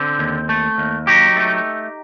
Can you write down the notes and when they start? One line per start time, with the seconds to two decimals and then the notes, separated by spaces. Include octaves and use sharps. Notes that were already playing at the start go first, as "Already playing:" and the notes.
Already playing: D3 C4
0.19 D#2
0.49 A3
0.78 D#2
1.07 F#3 D#4 G4
1.37 A3